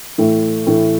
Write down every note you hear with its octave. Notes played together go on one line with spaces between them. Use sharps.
A2 E3 A3
A2 E3 A3